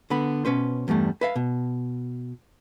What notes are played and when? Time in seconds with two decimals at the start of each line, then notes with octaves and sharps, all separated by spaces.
0.10 D3 B3 B5
0.45 B2 C#4 B4 C5
0.88 E2 G2 G3 A3
1.21 B4 E5 F5
1.36 B2